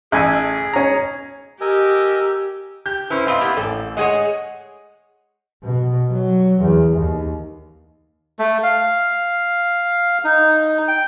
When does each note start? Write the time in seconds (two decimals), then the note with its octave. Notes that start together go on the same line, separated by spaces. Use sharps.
0.12 A1 G#4 G#5 E6
0.73 C#4 A#5
1.61 G4 A#4 D#5 G#5 E6
2.86 G4 G6
3.10 C#4 E4 B4 C5
3.26 A2 C4 D#5 F5 B5
3.41 A#3 B3 G4
3.57 A1 A4
3.97 G#3 G#4 C#5 D#5 F#5
5.63 B2
6.12 F#3
6.62 E2
6.97 D#2
8.39 A3
8.63 F5
10.24 D#4
10.88 G5